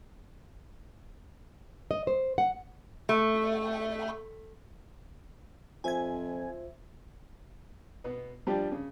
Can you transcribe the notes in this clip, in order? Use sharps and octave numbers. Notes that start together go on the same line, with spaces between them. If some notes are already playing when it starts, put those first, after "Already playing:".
D#5
C5
F#5
A3
F2 F4 C5 E5 G#5 G#6
B2 B3
F3 G3 D4 G4
C#3